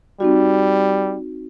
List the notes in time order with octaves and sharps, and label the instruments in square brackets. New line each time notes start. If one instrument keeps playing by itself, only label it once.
[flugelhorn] G3 [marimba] C4 D#4 F#4